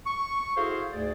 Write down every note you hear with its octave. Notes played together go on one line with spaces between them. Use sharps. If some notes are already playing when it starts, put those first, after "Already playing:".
C#6
E4 F#4 G#4 A4 C5 F5
D2 G#2 G#4 D5